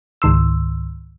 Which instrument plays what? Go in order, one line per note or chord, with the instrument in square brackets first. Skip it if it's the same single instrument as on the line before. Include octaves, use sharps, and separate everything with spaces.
[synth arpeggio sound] C#2 G#2 D#3 C6 E6